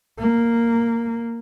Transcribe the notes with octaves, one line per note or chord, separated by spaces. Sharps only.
A#3